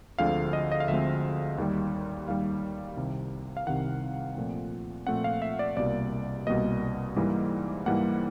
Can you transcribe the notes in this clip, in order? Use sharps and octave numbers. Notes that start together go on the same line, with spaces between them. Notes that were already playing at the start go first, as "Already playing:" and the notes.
D2 D3 F3 G#3 C4 F5
D#5
D#5
F5
D2 D3 F3 G#3 C4 E5
D#2 D#3 G3
D#2 D#3 G3 F5
C2 C3 D#3
F5
C2 C3 D#3 F#5
A#2 F3 A3 C4
A#2 F3 A3 C4 F#5
F5
E5
D5
C2 B2 G3 A#3 D5
C2 B2 G3 A#3 D#5
G#2 E3 G3 A#3
G#2 E3 G3 A#3 F#5